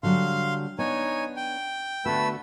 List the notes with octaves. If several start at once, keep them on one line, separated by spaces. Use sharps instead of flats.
D3 F#3 G3 F5 C6
B3 D4 D#4 C#5 G#5
G5
D3 A3 B3 F#4 B4 E6